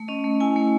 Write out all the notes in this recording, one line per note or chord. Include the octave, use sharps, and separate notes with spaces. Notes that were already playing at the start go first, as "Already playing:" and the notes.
Already playing: A3
C#4 D#5
A3
E4 G#5
A3